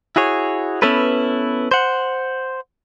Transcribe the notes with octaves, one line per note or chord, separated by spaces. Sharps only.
E4 F#4 G#4 C#5
B3 C#4 E4 A4 B4
C5 F#5